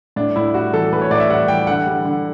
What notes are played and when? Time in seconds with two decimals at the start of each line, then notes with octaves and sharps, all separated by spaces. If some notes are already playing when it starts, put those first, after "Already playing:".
0.16 A2 D4
0.36 A2 E4
0.54 G3 F#4
0.73 E3 A4
0.92 A2 B4
1.01 C#5
1.10 A2 D5
1.20 E5
1.29 G3 F#5
1.48 E3 G5
1.67 D3 F#5
1.87 G3
2.05 D3